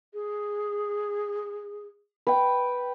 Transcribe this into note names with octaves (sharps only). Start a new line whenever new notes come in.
G#4
B4 G5